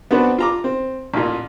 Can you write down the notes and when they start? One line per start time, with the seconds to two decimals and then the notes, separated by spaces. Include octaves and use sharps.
0.11 B3 C4 D4 F#4 B4
0.38 F4 A#5 D6
0.64 C4
1.14 A1 A#2